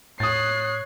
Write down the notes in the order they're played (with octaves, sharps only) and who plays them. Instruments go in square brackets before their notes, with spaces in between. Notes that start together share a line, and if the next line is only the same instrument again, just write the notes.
[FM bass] A2 [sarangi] C#5 [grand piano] D#6 A6 [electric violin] F#6 C7